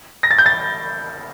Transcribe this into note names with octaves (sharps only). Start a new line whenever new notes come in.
A#6
A6
G6
A6